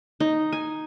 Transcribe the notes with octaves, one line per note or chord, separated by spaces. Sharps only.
D#4
G#5